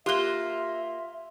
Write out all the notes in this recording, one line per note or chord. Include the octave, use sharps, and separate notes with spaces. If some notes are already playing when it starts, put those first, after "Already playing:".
A#3 F4 G4 E5 F#6 G7